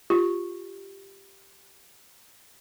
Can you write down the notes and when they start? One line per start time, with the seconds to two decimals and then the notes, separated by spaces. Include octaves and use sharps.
0.10 F4 G4